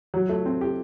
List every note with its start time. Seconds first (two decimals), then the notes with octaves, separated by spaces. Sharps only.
0.14 F#3
0.29 A3
0.46 C4
0.61 G4